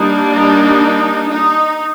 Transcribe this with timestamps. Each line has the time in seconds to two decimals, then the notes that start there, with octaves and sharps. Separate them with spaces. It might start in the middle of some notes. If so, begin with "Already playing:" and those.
Already playing: G3 A#3 D4 D#4
0.30 D#4
1.29 D#4